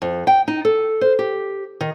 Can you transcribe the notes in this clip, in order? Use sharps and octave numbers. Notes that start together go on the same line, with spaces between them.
F2
G5
D#4
A4
C5
G4
D#3